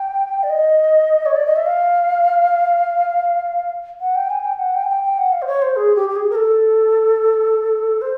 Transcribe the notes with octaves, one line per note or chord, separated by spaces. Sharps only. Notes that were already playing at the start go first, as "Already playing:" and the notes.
Already playing: G5
D5
D#5
C#5
D5
D#5
E5
F5
F#5
G5
G#5
G5
F#5
G5
G#5
G5
G5
F#5
F5
C5
C#5
C5
G#4
G4
G4
G#4
A#4
A4
C5